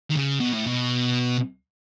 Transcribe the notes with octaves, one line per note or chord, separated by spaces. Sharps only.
D#3
C#3
B2
A2
B2